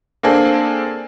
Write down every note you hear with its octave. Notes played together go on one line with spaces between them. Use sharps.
A#3 C4 D4 G#4 A4